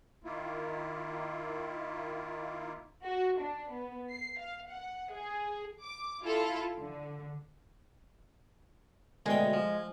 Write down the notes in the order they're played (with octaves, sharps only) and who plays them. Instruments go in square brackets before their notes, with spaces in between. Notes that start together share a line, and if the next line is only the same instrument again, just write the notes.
[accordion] D#3 A#3 E4 F4
[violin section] F#4
D4
B3
C7
F5
F#5
G#4
[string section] D6
E4 F4 A4
D3
[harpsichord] D2 B2 G5 [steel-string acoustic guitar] G#3
[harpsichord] F3